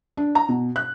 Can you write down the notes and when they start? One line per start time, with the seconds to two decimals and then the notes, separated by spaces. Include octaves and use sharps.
0.17 D4
0.35 A#5
0.49 B2
0.76 F#6